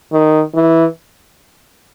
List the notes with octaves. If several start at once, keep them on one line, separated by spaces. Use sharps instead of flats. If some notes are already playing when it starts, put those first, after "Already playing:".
D#3
E3